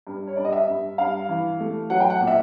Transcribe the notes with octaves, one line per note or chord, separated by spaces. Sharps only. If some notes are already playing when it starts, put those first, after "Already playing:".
G2
C#5
G2 D5
D#5
E5
G2
G2 F5
E3
A3
F#3 F#5
G5
F#5
A#2
E5